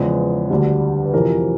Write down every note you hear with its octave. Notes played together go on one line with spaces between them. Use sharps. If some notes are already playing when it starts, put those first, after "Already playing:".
Already playing: E2 C#3 F3 G#3 B4
D2 D3 G3
B4
F2 C3 E3 A#4